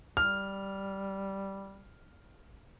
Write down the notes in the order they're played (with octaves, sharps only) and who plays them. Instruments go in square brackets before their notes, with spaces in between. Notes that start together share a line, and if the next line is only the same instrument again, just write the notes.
[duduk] G3 [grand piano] F6